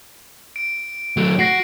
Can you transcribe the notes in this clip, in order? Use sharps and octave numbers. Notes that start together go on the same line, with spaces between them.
D7
F#3 A3
F#4 A#6 C7 D7